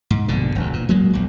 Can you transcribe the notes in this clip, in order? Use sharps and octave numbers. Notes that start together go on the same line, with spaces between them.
G#2
A#1 G2 B2 D3
E1 D2
A#2
F#3 G#3 A#3
A#1 E2